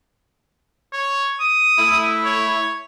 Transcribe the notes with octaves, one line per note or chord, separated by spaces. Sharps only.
C#5
D#6
A3 E4
C#5